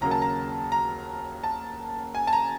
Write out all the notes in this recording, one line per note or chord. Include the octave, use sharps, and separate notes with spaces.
D#2 C#3 F#3 A#3 A#5
A5
A#5
A#5
A5
G#5
A5
A#5